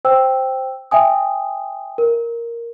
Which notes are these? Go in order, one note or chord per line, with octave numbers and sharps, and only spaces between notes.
C5 G5 E6
E5 G5 G#5 D#6
A#4